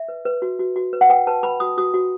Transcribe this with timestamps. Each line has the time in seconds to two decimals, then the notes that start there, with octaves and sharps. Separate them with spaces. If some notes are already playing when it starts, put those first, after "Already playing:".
Already playing: E5
0.08 B4
0.25 B4
0.42 F#4
0.59 F#4
0.76 F#4
0.93 B4
1.01 F#5
1.09 B4 G5
1.27 B4 A5
1.43 B4 B5
1.60 F#4 D#6
1.78 F#4 D#6
1.94 F#4